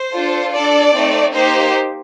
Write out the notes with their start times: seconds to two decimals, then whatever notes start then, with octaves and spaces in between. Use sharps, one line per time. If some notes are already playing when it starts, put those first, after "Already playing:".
Already playing: C5
0.14 D4 F4 A4
0.54 D4 A4 D5
0.94 A3 C4 D#4
1.34 A#3 D#4 G4 C5